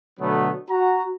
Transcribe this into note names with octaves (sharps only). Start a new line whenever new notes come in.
B2 D3 F#3 A3 B3
F#4 A#5